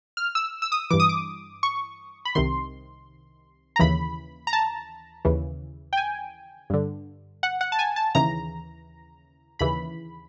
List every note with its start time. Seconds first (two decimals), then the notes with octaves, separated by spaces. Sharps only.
0.17 F6
0.35 E6
0.62 E6
0.72 D#6
0.90 G2 E3 D6
1.00 D#6
1.09 D6
1.63 C#6
2.25 B5
2.35 C2 C3 D#3 C6
3.76 A#5
3.79 D#2 C#3 E3 B5
4.47 A#5
4.53 A5
5.25 D#2 C#3 E3
5.93 G5
5.97 G#5
6.70 G2 D3
7.43 F#5
7.61 F#5
7.72 A5
7.79 G#5
7.96 A5
8.15 D#2 C#3 E3 A#5
9.59 D#2 C#3 E3 B5